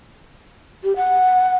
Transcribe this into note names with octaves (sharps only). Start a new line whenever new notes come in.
G4
F#5